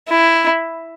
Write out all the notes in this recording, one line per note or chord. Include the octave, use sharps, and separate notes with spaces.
E4